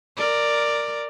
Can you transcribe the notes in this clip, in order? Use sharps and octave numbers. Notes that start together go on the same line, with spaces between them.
A#4 D5